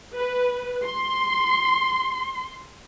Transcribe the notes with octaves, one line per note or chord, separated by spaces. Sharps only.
B4
C6